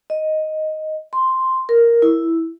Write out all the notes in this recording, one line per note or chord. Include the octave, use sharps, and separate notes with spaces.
D#5
C6
A#4
E4